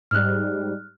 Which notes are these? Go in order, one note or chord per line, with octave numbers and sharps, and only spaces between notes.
G#2 G3 F6 F#6